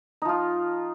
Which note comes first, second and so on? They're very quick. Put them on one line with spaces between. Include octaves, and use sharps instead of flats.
D#4 F3 F4